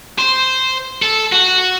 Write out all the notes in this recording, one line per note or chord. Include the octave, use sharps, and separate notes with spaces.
C5
A4
F#4